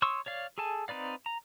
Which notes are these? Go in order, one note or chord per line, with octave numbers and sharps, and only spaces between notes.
C#5 C6 C#6 D#6 E6
C#5 D5 F5
G#4 A4 G#5 A5
C4 D#4 B4 D5 F5
A#5